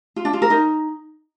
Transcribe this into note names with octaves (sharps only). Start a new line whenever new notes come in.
F4
D4
F4
A#4
D#4